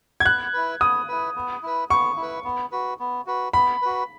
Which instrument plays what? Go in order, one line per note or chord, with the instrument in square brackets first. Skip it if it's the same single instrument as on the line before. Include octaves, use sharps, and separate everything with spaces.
[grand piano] G#6
[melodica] B3 [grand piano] F#6
[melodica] E4 B4
[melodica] B3 [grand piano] D#6
[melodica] E4 B4
B3
E4 B4
[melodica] B3 [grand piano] C#6
[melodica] E4
B4
B3
F#4 B4
B3
F#4 B4
[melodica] B3 [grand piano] B5
[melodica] F#4 B4